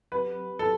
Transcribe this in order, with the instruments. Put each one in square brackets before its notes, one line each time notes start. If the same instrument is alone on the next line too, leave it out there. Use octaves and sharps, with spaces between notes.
[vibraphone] F#3 C4 G4 [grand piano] B4
[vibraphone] F#3 C4 G4 [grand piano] A4